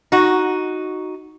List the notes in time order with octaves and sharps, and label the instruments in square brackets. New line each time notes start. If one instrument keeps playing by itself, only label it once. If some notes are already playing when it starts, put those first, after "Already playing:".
[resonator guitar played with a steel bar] D#4 F#4